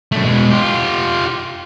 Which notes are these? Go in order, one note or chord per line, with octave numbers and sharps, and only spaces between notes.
F#2 A3
B2 G#3
F4 G4